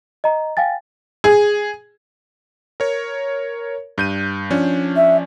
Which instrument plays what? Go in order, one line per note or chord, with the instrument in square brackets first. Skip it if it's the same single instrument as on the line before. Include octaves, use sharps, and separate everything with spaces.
[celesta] D#5 A#5
F5 G5 G#5 A6
[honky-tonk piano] G#4
[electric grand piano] A#4 C#5
G2 G6 D#7
F3 C#4 D4
[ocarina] E5